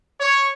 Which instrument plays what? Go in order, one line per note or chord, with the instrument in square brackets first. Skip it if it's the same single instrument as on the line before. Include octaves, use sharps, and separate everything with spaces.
[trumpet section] C#5